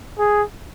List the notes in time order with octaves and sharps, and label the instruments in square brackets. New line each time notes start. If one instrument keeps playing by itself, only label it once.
[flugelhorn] G#4